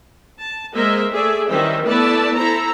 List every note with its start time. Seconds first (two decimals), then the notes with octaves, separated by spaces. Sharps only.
0.40 A5
0.74 G#3 A#3 A#4 C5 D#5 E5
1.10 A3 G#4 D5 E5
1.49 D#3 E3 G3 C#4 C5 E5
1.85 A3 B3 E4 B4 D5 A5
2.36 E4 A4 C5 A#5